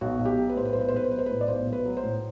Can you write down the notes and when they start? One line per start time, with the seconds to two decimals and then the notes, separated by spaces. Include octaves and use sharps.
0.01 B1 F#4
0.19 B1
0.25 G4
0.37 F#3
0.49 B4
0.56 A2 C5
0.65 B4
0.73 B1 C5
0.81 B4
0.88 C5
0.93 B1 B4
1.04 C5
1.11 F#3 B4
1.19 C5
1.26 A2 B4
1.41 D5
1.48 B1 C5
1.67 B1
1.73 B4
1.85 F#3
1.97 C5
2.03 A2